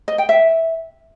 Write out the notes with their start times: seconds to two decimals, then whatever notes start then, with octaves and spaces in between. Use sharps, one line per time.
0.08 D#5
0.18 G5
0.29 E5